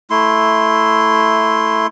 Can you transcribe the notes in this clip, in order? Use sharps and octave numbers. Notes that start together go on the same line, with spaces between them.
A3 E4 C6